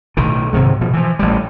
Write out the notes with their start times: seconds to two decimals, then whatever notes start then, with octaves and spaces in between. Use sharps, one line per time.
0.17 B1 A2 D#3
0.53 G#2 C3 D#3 F#3
0.81 B2 F3
0.93 E3 F3
1.19 A1 G3